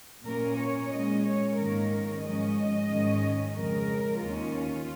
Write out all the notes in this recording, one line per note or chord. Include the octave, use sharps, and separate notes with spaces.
A#2 A#3 C#4 A#4
C#5
A#2 G#3 C#4 D#5
C#5
G#2 D#3 A#3 C#4 A#4
G#2 F3 G#3 C#4 D#5
G#2 D#3 G#3 C#4
F2 C#3 G#3 A#4
D#2 D#3 C#4 F4